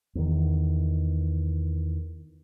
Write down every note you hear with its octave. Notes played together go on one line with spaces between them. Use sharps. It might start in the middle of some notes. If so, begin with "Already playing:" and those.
E2 D#3